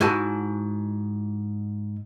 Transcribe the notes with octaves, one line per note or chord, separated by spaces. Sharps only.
G#2 E4 F#4 G#5 A5